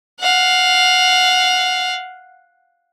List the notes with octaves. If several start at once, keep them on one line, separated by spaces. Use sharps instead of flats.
F5 F#5